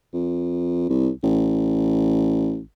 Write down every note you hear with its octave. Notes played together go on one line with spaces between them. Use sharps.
F2
C2
A1